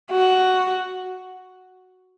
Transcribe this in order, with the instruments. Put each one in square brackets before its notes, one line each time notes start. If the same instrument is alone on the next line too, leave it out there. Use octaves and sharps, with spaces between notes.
[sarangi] F#4